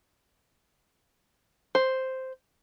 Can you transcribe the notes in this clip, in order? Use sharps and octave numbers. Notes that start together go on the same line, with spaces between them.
C5